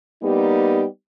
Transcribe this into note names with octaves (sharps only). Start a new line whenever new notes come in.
G3 A#3 B3 D#4 G4